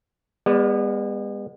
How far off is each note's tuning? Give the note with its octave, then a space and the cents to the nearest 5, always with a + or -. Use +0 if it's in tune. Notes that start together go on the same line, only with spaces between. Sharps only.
G#3 -40 B3 +0 D5 +0